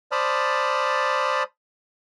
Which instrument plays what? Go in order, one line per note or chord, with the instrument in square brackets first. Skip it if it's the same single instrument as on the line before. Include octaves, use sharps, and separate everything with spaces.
[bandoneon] C5 D5 A5 B5 D#6 F6